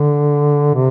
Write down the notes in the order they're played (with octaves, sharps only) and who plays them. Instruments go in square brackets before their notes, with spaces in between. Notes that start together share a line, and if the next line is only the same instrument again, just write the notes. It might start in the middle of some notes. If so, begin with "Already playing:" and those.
Already playing: [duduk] D3
C3